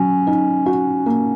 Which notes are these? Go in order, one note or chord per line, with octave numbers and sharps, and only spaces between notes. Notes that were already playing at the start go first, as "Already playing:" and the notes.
Already playing: F#3 C#4
D#4
F#4
A#3